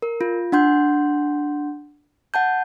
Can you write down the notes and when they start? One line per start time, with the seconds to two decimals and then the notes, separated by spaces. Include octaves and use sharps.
0.02 A#4
0.21 F4
0.52 D4 F#5 C6 G6
2.34 F#5 A5 G6